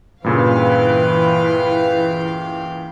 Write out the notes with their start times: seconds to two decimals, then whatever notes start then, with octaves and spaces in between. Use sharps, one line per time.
0.24 G2 A#2 C#3 E3 B4 F5 G5